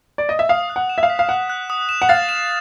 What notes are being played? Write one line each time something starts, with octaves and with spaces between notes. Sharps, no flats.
D5
D#5
E5
F5 D#6
F#6
F#5
E7
E5
F5
B6
F5
F#5 F#6
F#6
D#6
E7
F#5
F5 A6
E7